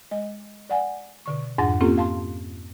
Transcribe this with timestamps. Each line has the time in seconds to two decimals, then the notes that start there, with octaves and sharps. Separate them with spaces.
0.11 G#3 D#5
0.70 D5 F#5 G#5
1.26 B2 D3 C#6
1.58 F2 G#2 D4 F#5 A6 A#6
1.81 A#3 C4 C#4 F4 G4 A4
1.98 F5 A5 C6